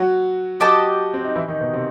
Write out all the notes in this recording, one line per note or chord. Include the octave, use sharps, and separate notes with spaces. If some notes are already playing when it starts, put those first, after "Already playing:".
Already playing: F#3 F#4
F#3 F#4 G4 D#5 A5
C4
D#4
E3 E4
D#3 D#4
B2 B3
C3 C4